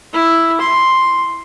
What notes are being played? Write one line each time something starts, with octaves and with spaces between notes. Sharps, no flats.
E4
C6